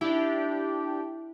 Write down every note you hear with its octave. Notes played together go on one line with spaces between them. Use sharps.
D4 E4 G4